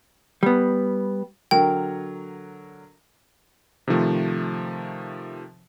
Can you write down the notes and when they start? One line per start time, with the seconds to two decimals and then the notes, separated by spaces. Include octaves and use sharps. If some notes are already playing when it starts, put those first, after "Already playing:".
0.43 G3 B3
1.51 D3 F#3 A#4 G5
3.88 C3 D#3 F3 A3